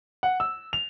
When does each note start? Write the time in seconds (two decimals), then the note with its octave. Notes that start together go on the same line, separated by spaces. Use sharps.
0.23 F#5
0.40 E6
0.73 F7